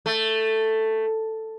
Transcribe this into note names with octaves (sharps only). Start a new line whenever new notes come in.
A3